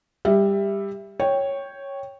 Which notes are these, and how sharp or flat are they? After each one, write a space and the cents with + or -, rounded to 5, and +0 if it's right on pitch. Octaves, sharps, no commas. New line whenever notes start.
G3 +20 E5 +0
C#5 -5 G5 +0